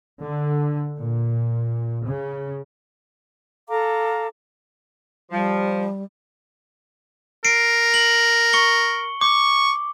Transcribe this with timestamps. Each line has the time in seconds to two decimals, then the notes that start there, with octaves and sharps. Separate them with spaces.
0.22 D3
1.00 A#2
2.06 C#3
3.68 A4 F5 A#5 D6
5.31 F3 G3
7.45 A#4 C7 D7
7.94 F#7
8.53 C#6 C#7 G7
9.21 C#6 D6